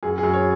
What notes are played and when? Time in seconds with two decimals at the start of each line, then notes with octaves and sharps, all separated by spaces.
0.03 F#2 G#4
0.18 G#4
0.23 F#2
0.33 C#5